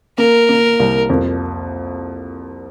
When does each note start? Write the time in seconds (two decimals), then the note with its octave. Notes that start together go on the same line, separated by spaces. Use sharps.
0.18 A#3 A#4
0.49 A#3
0.80 C2
1.10 F2